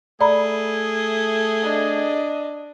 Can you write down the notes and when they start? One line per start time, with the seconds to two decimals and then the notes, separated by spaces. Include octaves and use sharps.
0.21 A3 G#4 D5 A#5 B5
1.63 D4 D#5